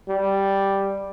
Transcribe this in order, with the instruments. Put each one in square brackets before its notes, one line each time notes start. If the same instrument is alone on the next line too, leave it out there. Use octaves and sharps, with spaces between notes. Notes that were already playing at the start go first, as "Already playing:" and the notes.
[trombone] G3